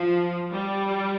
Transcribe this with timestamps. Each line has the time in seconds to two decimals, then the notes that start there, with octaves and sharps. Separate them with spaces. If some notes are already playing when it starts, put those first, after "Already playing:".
Already playing: F3
0.52 G3